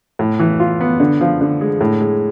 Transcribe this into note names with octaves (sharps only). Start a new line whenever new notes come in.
A2
E3
F4
B3
D3
F3
D3
G#3
A2
G#3